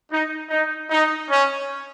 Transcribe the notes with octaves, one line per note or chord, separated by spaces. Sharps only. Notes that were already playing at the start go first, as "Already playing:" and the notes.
D#4
D#4
D#4
C#4